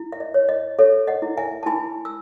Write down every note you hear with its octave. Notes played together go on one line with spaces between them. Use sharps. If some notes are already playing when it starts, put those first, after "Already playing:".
Already playing: E4
E5
D#5
C#5
D#5
A4 C#5 E5
D#5 F#5
E4
E5 G#5
A5
E4 G#5 B5
E6